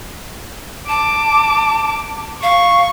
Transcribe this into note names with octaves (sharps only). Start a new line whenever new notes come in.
A5 D6
F5 C#6